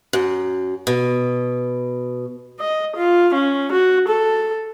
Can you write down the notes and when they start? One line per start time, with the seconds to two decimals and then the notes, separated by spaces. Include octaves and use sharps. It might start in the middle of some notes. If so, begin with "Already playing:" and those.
0.13 F#2
0.87 B2
2.60 D#5
2.96 F4
3.34 C#4
3.72 F#4
4.08 A4